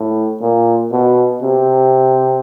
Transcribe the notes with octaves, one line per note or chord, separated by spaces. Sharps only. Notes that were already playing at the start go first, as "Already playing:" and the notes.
Already playing: A2
A#2
B2
C3